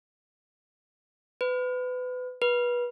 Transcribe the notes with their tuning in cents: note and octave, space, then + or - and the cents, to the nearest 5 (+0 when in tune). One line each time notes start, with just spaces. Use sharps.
B4 +30
B4 -25